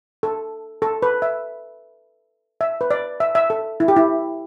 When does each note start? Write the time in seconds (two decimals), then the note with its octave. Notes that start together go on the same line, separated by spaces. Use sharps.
0.23 A4
0.82 A4
1.02 B4
1.22 E5
2.61 E5
2.81 B4
2.91 D5
3.20 E5
3.35 E5
3.50 A4
3.80 E4
3.88 G4
3.96 E4